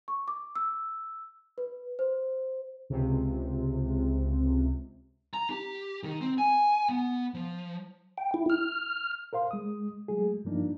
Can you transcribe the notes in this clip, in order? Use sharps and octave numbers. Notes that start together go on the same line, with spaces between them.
C#6
D6
E6
B4
C5
C#2 C3
A#5
G4
D#3
C4
G#5
B3
F3
G5
E4
F6
A#4 C5 F5 C6
G#3 D#6
F#3 G#3 A3 G#4
G2 F3 A#3 D4 D#4